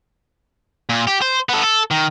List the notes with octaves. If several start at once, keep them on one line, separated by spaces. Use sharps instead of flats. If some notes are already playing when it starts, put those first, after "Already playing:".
A#2
G4
C5
B3 A4
A4
D#3